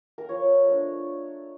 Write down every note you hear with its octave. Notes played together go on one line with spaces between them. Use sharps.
A#4
F3 C#5
A3 D4